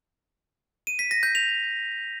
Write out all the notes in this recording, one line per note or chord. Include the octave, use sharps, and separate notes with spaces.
D#7
B6
A#6
G6
F7